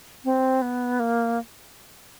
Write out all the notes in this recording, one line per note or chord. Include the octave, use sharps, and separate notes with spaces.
C4
B3
A#3